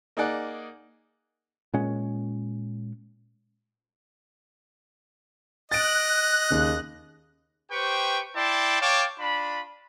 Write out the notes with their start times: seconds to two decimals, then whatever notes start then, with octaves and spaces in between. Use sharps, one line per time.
0.17 A#3 D#4 G#4 D5 F#5
1.74 A#2 G#3 C#4
5.71 D#5 F#6 A6 D7
6.50 D#2 C#3
7.72 G4 B4 C5 G5 C#6
8.36 E4 D5 G5 A5 C6
8.81 C#5 F5 G5 A5 D6
9.19 D4 F4 B5